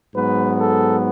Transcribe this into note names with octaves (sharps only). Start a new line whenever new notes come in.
G#2 F#3 B3 B4
A4